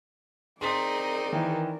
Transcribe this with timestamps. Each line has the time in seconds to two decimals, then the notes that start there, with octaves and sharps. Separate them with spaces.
0.61 C4 D#4 G#4 A#4 D5 C6 A6 B6
1.33 D#3 E3